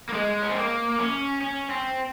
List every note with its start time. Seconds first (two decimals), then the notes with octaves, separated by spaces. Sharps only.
0.09 A#3
0.14 G#3
0.42 C#4
0.49 C4
0.56 A#3
0.99 C#4
1.41 C#4
1.70 C4